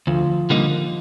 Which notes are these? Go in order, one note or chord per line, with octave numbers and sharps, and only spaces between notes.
D2 F3
D3 G3 A#3 D#4